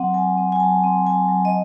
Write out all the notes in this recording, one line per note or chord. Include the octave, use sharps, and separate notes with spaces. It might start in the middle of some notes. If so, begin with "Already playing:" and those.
Already playing: F#3 C4 F#5
F#3 G#5
C4
G#5
F#3 A5
C4
F#3 G#5
F#3
D#5